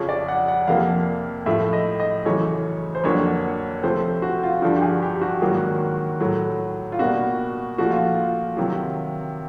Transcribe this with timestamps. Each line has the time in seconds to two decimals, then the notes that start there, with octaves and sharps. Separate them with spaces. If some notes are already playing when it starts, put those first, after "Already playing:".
Already playing: F2 C#3 F3 C#5
0.09 D5
0.28 F#5
0.48 F#5
0.67 F2 C3 F3 A#3 F5
1.46 A2 F3 A3 E5
1.73 D#5
2.00 D#5
2.25 F#2 C#3 E3 A3 C#5
2.95 C5
3.04 F2 D3 F#3 A#3 C#5
3.83 C3 F3 A3 C5
4.22 F#4
4.43 F4
4.62 G2 D3 F3 F#4
4.76 G4
4.82 G#4
5.02 G4
5.21 F#4
5.42 G#2 D#3 F#3 A#3
6.20 A2 F#3 A3
6.92 F4
6.99 B2 G3 A#3 F#4
7.78 A#2 F3 A3 F#4
7.91 F4
8.15 F4
8.57 C3 D#3 F#3